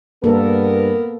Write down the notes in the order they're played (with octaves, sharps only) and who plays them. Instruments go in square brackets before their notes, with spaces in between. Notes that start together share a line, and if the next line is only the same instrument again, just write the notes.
[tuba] G2 [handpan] A#3 A4 [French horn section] B3 A#4